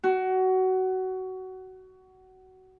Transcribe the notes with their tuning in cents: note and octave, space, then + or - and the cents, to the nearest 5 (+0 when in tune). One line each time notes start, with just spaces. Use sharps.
F#4 +20